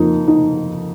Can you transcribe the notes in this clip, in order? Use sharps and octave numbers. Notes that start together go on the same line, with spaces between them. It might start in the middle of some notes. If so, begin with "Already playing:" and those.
Already playing: F2 F3 A#3 D#4
D#4